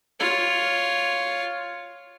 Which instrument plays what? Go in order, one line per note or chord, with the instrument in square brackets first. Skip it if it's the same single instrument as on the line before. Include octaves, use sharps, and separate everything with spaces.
[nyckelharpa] F4 C#5